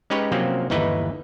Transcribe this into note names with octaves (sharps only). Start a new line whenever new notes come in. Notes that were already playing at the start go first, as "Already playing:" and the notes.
G#3 C#4 D#4 G4 B4 C#5
C3 F3 F#3 A#3 C4 C#4
G1 D#2 E3 D#4 E4 B4